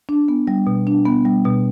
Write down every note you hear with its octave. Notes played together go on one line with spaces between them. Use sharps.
D4
B3
G3
B2
D4
B3
G3
B2